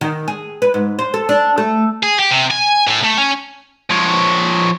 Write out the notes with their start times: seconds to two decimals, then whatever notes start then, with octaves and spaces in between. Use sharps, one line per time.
0.01 D#3
0.28 G#4
0.62 B4
0.74 G#2
0.99 C5
1.14 A4
1.29 D4
1.58 A3
2.03 G#4
2.19 G4
2.31 C3
2.51 G#5
2.87 A2
3.04 A3
3.18 C#4
3.91 F3 C#5